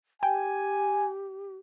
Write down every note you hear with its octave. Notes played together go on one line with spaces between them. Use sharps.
G4 G5 G#5